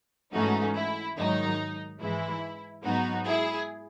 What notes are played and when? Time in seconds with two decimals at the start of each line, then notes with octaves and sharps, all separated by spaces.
0.33 G#2 E3 A3 C#4 D#4 F#4
0.75 E4
1.17 G#2 D#3 F#3 D#4
2.00 G#2 E3 G#3 E4
2.85 G#2 F#3 B3 D#4 F#4
3.26 E4 G#4